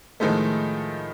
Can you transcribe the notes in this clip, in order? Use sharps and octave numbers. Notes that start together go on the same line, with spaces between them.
A2 D#3 F3 G#3 A3